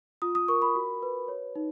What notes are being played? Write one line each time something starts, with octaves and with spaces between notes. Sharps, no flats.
F4 D#6
D#6
A#4 C#6
B5
F#4
B4
C#5
D#4